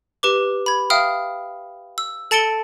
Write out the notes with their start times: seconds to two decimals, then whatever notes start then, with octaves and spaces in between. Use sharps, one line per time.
0.23 G4 B4 D6
0.66 B5 G#6
0.90 E5 F5 G5 D#6 F6
1.98 E6
2.31 A4 A5 A6 C#7 D7 G7